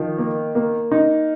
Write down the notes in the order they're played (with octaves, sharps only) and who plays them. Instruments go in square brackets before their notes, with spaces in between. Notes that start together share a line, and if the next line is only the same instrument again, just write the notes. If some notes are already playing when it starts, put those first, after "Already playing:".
Already playing: [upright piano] D#3 F3
A#3
A#3
D#4